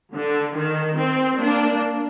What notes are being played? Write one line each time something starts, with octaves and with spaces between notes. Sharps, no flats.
D3
D#3
C4
A#3 D4